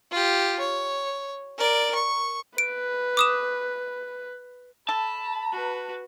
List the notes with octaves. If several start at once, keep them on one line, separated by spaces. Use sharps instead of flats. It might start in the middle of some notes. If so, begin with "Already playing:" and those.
F4 G4
C#5
A#4 D5
C#6
B4 D7
D6 D#6 E7
A4 A5 B5
F#4 B4